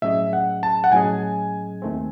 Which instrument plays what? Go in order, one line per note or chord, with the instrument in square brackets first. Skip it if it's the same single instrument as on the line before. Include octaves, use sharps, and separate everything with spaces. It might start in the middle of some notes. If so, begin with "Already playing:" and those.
[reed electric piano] A2 F#3 C#4 G#4 D#5 [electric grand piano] E5
[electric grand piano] F#5
A5
F#5
[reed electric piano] A2 F#3 C#4 G#4 D#5 [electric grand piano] G#5
[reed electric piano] D#2 D#3 A3 C4